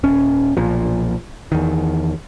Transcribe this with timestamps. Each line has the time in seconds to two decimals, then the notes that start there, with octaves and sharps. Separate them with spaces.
0.03 D#1 C#4
0.57 B1 A#2 F3
1.52 E2 D#3